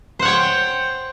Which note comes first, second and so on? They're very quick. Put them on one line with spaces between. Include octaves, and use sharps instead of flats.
C5 F#5 C#5 G5